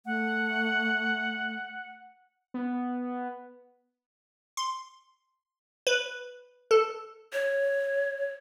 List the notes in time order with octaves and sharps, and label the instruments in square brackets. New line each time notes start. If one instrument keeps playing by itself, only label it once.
[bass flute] A3 [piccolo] F#5
[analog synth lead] B3
[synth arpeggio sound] C6
B4
A4
[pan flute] C#5